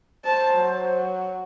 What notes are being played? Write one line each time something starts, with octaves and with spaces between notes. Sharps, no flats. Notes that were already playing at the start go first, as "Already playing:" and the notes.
C5 A5
F#3